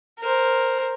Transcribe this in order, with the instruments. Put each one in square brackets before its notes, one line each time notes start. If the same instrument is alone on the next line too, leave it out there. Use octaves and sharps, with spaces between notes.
[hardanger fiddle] A#4 C5